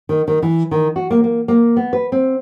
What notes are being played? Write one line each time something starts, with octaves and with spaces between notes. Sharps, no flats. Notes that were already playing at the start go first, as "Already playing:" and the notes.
D#3
D#3
E3
D#3
F#4
A#3
A#3
A#3
B3
B4
C4